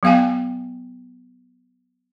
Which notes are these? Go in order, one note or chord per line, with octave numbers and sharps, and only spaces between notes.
F#3 B3 F5 G5 G#5